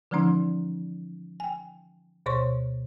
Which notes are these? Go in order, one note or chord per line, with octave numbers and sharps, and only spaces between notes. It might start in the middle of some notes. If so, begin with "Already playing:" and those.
D3 E3 F3 G#3 C#4 D#4
G5 G#5
D2 B2 C5 C#5 C6 C#6